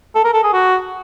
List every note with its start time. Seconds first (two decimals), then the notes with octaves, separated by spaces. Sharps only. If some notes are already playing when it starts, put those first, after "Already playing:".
0.15 A4
0.24 A#4
0.33 A4
0.43 G#4
0.53 F#4